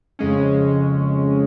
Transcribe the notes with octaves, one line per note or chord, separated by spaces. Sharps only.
F2 C#3 G#3 C#4